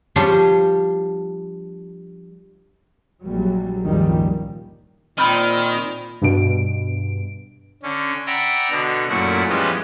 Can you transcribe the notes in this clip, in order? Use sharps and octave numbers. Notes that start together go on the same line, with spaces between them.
F3 G3 D4 C5 C#5 C6
A#1 F#3 G3
C#2 G2 A#2 D#3 F3 G3
A#2 D#3 C4 B5 F6
G2 B2 D7
D3 C#4
D5 E5 F#5 G5 A#5 B5
B2 D3
F#2 A#2 A3 C#4 E4 F#5
E3 F3 G3 G#3 B3 C#4